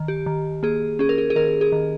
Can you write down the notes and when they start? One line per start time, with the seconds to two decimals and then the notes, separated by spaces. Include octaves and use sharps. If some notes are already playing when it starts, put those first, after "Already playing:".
Already playing: D#3
0.08 G4
0.26 D#3
0.63 A#3 G#4
0.99 C#4 G#4
1.09 A#4
1.18 G#4
1.30 G#4
1.36 D#3 A#4
1.61 G#4
1.72 D#3